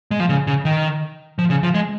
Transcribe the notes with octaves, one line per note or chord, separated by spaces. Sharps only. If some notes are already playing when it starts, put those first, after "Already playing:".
G#3
F3
C#3
C#3
D#3
F3
C#3
F3
G#3